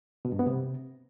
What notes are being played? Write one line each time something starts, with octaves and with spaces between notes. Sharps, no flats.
B2
G2
B3
C3